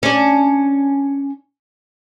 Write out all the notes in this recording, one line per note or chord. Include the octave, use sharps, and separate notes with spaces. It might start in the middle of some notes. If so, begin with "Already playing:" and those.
C#4 D4